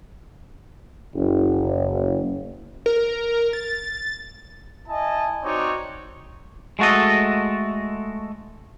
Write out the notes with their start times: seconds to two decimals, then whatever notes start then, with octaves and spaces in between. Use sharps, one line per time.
1.15 F#1
2.86 A#4
3.53 A6
4.88 E4 D#5 G#5 A5
5.44 C4 D#4 F#4 C#5 D5
6.79 G#3 A3 F#4 A4 D#5